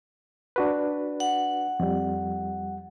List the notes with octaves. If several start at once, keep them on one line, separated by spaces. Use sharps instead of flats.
D4 F#4 B4
F#5
F2 G3